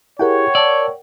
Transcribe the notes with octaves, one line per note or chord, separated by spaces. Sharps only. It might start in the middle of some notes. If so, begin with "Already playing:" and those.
E4 G4 G#4 A#4 C#5 F#5 G5
D5 A5 E6